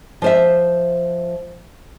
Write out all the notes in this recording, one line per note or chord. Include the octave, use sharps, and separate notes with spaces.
F3 C5 E5